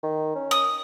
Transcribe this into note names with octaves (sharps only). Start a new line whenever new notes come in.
D#3
C#4
D#6